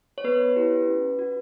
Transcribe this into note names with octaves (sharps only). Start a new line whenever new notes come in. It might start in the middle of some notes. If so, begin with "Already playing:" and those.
C#5
B3 B4
E4 G4
C#4
F#4